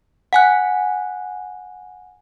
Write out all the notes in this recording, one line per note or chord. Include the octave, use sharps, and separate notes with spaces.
F#5 G#5 F#6